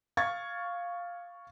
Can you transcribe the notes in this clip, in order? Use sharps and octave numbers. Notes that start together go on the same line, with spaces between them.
F5 C#6 G#6 A6